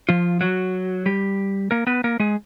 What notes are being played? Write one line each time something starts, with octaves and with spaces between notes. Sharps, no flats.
F3 F4
F#3 F#4
G3 G4
A#3 A#4
B3 B4
A#3 A#4
G#3 G#4